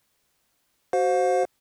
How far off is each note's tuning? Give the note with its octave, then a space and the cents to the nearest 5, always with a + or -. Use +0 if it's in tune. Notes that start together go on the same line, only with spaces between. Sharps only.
F#4 +20 C5 +0 F5 +40